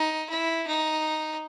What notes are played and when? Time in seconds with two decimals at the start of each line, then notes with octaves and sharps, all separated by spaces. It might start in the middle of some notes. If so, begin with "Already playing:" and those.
Already playing: D#4
0.30 E4
0.67 D#4